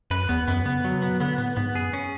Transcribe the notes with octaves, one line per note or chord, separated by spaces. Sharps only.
F#2 B4
E2 B3
F#2 B3
C#3 B3
D3
F#3
C#3
B2 B3
D3 B3
A2 B3
G#2 B3
F#2 G#4
C#4